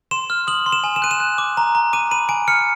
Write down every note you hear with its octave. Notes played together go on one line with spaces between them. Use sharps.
C6 E7
F6
D#6 F#7
C6
E7
G#5
E7
F#6 D#7
E7
F#6
D6
A#5
A#5
D6 D#7
B5 D#7
G#5 D7
F6 C#7